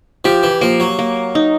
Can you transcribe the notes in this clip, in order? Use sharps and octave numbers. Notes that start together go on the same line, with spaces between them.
F3 G4
E3
F3 A#3
F#3
A#3
D#4